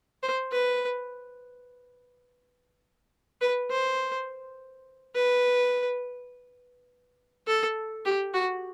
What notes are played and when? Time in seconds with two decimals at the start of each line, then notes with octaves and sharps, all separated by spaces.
0.23 C5
0.52 B4
3.41 B4
3.70 C5
5.15 B4
7.47 A4
8.05 G4
8.34 F#4